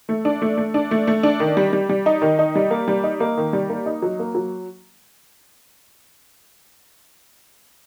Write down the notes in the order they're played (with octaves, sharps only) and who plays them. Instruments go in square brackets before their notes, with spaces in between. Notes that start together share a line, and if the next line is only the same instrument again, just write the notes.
[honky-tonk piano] A3
D4
A3
A3
D4
A3
A3
D4
D#3
G3
G3
G3
D#4
D#3
D#4
G3
A#3
G3
D#4
A#3
D#3
G3
A#3
D#4
F#3
A#3
F#3